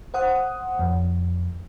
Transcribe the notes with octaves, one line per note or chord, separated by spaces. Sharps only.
C5 F#5 D#6
F2